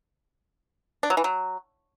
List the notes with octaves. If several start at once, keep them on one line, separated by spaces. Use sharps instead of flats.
D4
F#3
E3
F#3